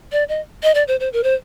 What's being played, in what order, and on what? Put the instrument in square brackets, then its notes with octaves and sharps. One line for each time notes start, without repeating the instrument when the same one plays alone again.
[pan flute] D5
D#5
D#5
D5
C5
C5
A#4
C5